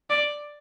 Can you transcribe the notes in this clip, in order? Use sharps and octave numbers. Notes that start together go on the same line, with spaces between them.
D5